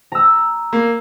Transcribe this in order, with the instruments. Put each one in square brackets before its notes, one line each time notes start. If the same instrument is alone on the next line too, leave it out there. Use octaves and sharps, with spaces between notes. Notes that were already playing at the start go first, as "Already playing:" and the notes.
[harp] A#5 E6
[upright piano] A#3